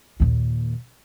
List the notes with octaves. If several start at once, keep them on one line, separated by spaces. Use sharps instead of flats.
D#2 A#2